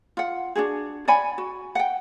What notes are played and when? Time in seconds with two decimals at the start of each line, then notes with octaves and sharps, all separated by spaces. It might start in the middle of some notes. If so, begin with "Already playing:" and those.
0.17 F4 F#5
0.56 D4 D#4 F#4 G#4
1.08 D5 F#5 G#5 B5
1.38 F#4
1.75 F#5 G5